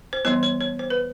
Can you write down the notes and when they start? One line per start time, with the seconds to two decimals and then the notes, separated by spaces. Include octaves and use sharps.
0.13 C5
0.25 E3 G3 B3 C#5
0.43 C#5
0.61 C#5
0.79 C5
0.90 B4